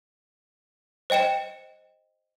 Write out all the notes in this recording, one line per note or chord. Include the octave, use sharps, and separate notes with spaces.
C5 D#5 G5 C#7 E7